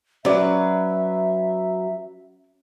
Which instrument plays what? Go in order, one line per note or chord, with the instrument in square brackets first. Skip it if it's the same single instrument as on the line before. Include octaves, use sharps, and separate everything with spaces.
[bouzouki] F#3 B4 [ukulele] C#4 D5 [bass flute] E5